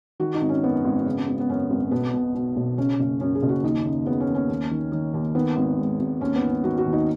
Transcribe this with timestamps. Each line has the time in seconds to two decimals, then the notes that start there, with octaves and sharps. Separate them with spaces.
0.20 D#3 F#4
0.34 D#4
0.41 G#1
0.49 C#4
0.63 F#2 B3
0.84 G#1
1.06 C#3
1.28 G#1
1.40 B3
1.49 F#2 C#4
1.70 G#1
1.91 B1 B3
2.14 B2
2.35 B2
2.56 B1
2.78 C#3 C#4
3.00 F#1
3.20 F#2 C#4
3.35 G#4
3.43 F#1
3.49 F#4
3.63 D#2 D#4
3.85 C#3
4.06 C#3 B3
4.20 C#4
4.28 D#2
4.35 C#4
4.49 D#2
4.71 D#3
4.92 D#3
5.14 D#2
5.35 D#3 B3
5.56 G#1
5.78 G#2
6.00 G#1
6.21 D#2 C#4
6.36 B3
6.42 D#3
6.50 C#4
6.64 D#3 F#4
6.78 F#4
6.86 D#2
6.93 D#4